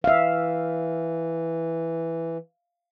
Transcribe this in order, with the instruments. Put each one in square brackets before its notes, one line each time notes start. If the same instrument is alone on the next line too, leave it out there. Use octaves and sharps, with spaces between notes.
[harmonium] E3 [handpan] E5 F5